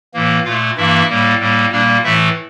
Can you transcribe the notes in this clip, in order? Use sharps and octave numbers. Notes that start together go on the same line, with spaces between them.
A2 E3 A#3
A#2 A3 F4 F5
G2 E3 A#3 E4 E5
A2 G3 A#3
A2 G3 A#3
A#2 G3 A#3 D4 D5
A2 E3 A3 E4 E5